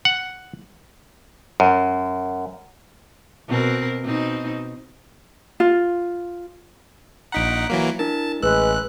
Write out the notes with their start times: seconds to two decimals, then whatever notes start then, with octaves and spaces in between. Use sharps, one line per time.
0.05 F#5
1.60 F#2
3.49 B2 C4 A#4
4.04 B2 C4 D#4
5.60 F4
7.32 A#1 D#4 F#5 A#5 B6 D7
7.70 E3 F#3 A#3
7.99 D4 E4 A#4 A5
8.43 A1 G#3 B4 E6 F#6